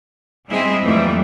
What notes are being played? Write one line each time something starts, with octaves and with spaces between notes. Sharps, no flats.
G3 G#3 C4 E4 G#4 D#5
F2 E3 F#3 G3 A3 A#3